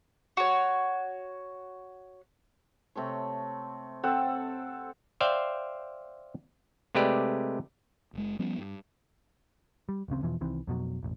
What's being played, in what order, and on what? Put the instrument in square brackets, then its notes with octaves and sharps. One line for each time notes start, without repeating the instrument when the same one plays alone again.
[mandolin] F#4 C#5
[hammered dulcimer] C3 A3 C#5
[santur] C4 A4 F#5
[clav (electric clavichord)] C5 D5 E5 F5 G5
C3 G#3 A3 G4 B4 D5
[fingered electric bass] F#1 G#3
F3 G3 B3 C#4
G2
[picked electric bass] G3
D1 A1 C#3 C4
E2 B2 E3 F3
C2 D#3 E3 C4
F2 B2 F#3
E1 A1